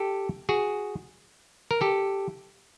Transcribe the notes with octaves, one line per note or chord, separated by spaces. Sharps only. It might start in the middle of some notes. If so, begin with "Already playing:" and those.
Already playing: G4 A4
F#4 G#4
A#4
G4 A4